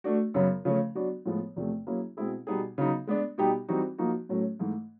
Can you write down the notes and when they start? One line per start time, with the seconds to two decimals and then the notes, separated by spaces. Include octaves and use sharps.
0.04 A3 D4 F#4
0.34 F#2 C#3 F#3 B3
0.65 C#3 F3 A3 C#4
0.95 F#3 B3 D4 F#4
1.26 A2 F3 G#3 B3
1.56 E2 C3 F3 A3
1.87 F#3 A#3 C#4 E4 G#4
2.17 B2 G#3 C4 E4 G#4
2.47 B2 G3 B3 D#4 G#4
2.78 C#3 F#3 B3 D#4
3.07 G#3 B3 D4
3.38 B2 G3 B3 D#4 G4
3.69 E3 G3 C4 D#4 F#4
3.98 F3 A#3 D#4 F#4
4.29 A2 F#3 A3 C#4
4.60 G#2 E3 A3